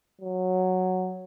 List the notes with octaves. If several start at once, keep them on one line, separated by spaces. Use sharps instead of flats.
F#3